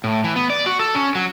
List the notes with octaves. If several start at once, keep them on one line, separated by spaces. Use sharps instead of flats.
A2
E3
B3
D5
F#4
A4
C#4
F#3